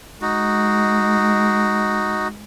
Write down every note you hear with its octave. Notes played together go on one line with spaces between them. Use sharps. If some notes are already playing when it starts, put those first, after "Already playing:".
G#3 D#4 F#4